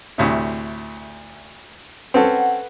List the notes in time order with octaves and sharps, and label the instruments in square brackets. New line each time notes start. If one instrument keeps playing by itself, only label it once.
[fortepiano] D2 A2 C3
[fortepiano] C4 C#4 A4 [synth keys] B4 F#5